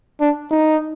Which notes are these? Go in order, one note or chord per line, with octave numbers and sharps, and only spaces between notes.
D4
D#4